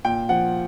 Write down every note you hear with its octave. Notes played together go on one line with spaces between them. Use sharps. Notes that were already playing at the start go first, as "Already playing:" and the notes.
A#2 G5
F3 F#5